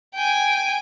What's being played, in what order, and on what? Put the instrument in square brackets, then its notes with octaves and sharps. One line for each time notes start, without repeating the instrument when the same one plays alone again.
[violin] G5 G#5